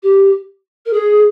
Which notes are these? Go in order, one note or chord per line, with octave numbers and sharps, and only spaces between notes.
G4
A#4
G#4